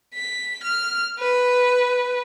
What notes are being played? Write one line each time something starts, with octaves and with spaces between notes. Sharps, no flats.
B6
F6
B4